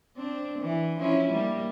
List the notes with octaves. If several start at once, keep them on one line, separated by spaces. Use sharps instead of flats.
C4 D4
E3
F3 C#4 E4
G3 A#3